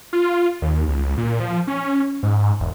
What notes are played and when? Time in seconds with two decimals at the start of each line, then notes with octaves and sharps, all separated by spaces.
0.13 F4
0.62 D#2
0.88 C#2
1.17 A#2
1.40 F3
1.67 C#4
2.23 G#2
2.60 E1